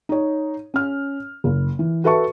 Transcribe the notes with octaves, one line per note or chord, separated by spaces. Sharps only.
D#4 C#5
C#4 F6
F#1
E3
F#4 A4 B4 E5 A5 C#6